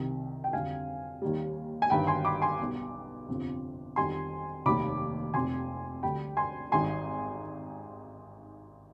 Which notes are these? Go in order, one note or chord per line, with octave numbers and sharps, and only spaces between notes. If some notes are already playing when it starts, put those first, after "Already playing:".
Already playing: C2 C3 D#3 G3
G5
F2 D3 G3 F5 G#5
D#2 D#3 G3
G#5
G1 G2 D#3 G5 B5
G#5 C6
B5 D6
G#5 C6
B1 B2 G3
G1 F2 C3 F3
F2 D#3 G3 G#5 C6
F1 D#2 D#3 G3 B5 D6
F1 F2 C3 G#5 C6
D2 D3 G3 G5 B5
G#5 C6
G#1 G#2 D#3 G3 G#5 C6